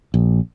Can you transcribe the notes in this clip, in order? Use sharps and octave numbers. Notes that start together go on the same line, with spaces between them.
A#1